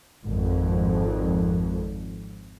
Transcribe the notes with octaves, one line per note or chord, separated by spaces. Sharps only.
G#1 F2